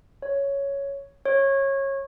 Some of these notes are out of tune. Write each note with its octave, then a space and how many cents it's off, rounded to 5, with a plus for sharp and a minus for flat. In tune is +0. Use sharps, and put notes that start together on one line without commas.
C#5 +5
C#5 -20